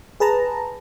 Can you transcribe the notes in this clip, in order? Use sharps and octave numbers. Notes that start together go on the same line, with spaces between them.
G#4 B4 A5 A#5